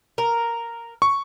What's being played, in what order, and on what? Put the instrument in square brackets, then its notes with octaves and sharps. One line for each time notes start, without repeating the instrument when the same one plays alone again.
[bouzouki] A#4
[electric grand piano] C#6